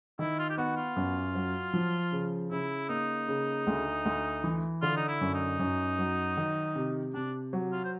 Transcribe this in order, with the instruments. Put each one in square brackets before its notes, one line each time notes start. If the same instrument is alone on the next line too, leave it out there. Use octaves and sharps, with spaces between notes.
[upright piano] D#3 [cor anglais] E4
[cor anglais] F4
G4
[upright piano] B3 [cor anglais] F#4
[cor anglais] F4
[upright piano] F#2
F#3
F3
C#3
[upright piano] C#3 [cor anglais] E4
[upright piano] A#3 [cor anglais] D#4
[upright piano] C#3
D2
D2
E3
[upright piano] D3 [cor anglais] F4
[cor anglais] D#4
E4
[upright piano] F#2
[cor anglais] D#4
[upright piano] F#2
F#3
D#3
C3
[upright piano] C3 [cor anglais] D4
[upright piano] F#3
[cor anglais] F4
C5